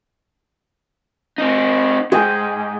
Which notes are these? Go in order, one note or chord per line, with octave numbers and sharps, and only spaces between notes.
C4 D#4
D2 G#2 G#4 G5